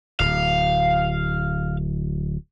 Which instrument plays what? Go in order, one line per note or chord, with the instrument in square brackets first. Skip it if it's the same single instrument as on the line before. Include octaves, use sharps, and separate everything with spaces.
[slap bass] D1 [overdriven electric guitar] F5